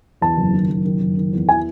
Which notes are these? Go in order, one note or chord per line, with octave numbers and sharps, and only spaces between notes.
E2 A5
F#1
D#3
F#1
D#3
F#1
D#3
E2
E3 G#5